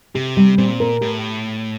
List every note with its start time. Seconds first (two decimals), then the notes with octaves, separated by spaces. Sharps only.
0.15 C3 G4
0.37 G3
0.58 A#2 C4
0.80 A#4
1.01 A2 G4